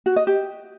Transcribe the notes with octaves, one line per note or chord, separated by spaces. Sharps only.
F#4
D#5
G4